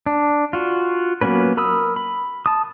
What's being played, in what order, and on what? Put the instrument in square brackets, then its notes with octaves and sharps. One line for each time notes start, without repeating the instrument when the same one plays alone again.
[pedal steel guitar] D4
F4 F#4
F#3 A#3 B3 C#4 B4
A#4 B5 D#6 E6
B5
A5 D#6